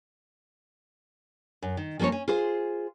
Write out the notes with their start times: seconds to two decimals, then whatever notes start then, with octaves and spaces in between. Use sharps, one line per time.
1.62 F#2
1.77 D#3
1.99 F3 A#3 C#4 C5 C#5
2.12 C#4
2.28 F4 G#4 C5